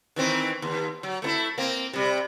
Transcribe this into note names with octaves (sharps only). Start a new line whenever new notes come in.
D#3 E3 C4
D#2
F#3
A3 B3 E4
A#3 C4
C3 G3